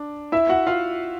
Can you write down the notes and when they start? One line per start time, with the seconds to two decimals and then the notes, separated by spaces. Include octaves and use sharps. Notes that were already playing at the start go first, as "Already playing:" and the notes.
Already playing: D4
0.32 E4 E5
0.49 F#4 F#5
0.67 F4 F5